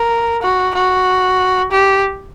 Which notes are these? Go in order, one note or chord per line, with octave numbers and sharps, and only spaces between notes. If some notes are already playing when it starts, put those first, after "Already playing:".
Already playing: A#4
F#4
F#4
G4